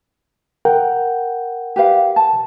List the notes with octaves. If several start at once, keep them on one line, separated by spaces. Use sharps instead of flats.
A#4 F#5 G5
G4 B4 F5
A5